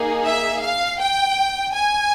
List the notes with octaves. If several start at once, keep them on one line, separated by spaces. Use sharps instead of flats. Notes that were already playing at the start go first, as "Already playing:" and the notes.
Already playing: A#3 D#4 G#4
E5
F5
G5
G#5